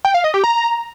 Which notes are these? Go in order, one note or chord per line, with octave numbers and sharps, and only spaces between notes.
G5
F5
D#5
G4
A#5